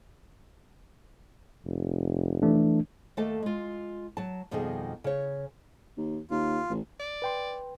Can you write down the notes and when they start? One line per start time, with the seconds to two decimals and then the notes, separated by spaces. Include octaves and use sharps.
1.65 F1
2.42 E3 A3 D4
3.17 D#2 A3 A#3 A4 D#5 A5
3.43 G#3 F4
4.17 F#3 A5
4.51 F2 B2 D#3 G3 D#4 G#4
5.04 C#3 C#5
5.97 D#2
6.31 D#2 F4
6.70 A1
7.00 D5
7.22 B4 G5 C6